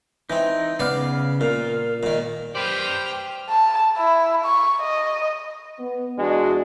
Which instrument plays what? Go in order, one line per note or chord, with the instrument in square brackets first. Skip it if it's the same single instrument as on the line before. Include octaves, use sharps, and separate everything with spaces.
[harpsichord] E3 C4 [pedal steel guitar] D#4
[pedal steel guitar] C#3 F5 F6 [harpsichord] B3 D5
[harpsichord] A#2 [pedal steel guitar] F4 F5 [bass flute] A#4
[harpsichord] A#2 D#3
[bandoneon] G4 C5 [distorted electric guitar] B4 D5 [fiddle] G5 F6
[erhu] A5
E4
C#6
D#5
[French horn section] B3
[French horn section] E2 D4 F#4 [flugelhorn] G#3